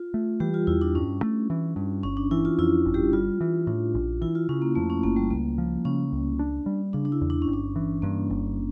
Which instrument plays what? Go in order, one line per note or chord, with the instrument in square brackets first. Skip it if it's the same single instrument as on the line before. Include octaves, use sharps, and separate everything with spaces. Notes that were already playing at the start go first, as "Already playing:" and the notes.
Already playing: [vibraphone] F4
[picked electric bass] A3
[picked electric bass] E3 [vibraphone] G3 G4
[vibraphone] F4
[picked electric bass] E2 [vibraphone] E4
[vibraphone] D4
[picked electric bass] G2 [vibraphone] C#4
[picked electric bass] A3
E3
G2
[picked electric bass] G1 [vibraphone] C#4
[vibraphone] D4
[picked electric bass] E3 [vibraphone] E4
[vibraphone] F4
[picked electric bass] F2 [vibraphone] E4
[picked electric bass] G1
[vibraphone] G3 G4
[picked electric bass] G3 [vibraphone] F4
[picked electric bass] E3
[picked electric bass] A2 [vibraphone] D4
[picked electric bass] A#1
[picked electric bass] E3 [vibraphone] E4
[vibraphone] F4
[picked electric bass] C#3 [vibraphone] C#4
[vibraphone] A#3
[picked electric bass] F2 [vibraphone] A3
[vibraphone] C#4
[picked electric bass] G1 [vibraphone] A#3
[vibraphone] G3
[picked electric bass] C#2 [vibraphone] A#3
[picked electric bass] F3
[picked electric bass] C#3 [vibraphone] C#4
[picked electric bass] C#2
D4
G3
[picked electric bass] C#3 [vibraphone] D4
[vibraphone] D4
E4
[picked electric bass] E2
[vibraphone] D4
C#4
[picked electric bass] G1
[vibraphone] D4
[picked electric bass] E3
[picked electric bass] G2 [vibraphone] A#3
[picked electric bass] G1